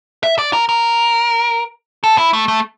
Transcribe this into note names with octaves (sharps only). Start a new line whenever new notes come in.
E5
D5
A#4
A#4
A4
E4
A3
A3